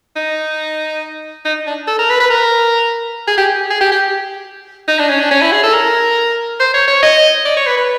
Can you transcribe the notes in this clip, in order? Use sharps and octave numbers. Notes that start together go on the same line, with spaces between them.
D#4
D#4
D4
A4
A#4
B4
B4
A#4
G#4
G4
G#4
G4
G4
D#4
D4
C#4
D4
C#4
E4
G#4
A4
A#4
C5
C#5
C#5
D#5
D5
C#5
B4
B4